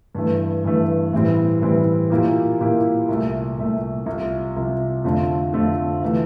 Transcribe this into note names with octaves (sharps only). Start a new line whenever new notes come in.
G2 E3 A3
G2 E3 A3
A2 E3 G3 C4
A2 E3 G3 C4
A#2 F3 A#3 E4 G4
A#2 F3 A#3 E4 G4
C2 A#2 A3
C2 A#2 A3
C2 C3 F3
C2 C3 F3
F2 D3 A3 C4 F4
F2 D3 A3 C4 F4
C3 E3 A3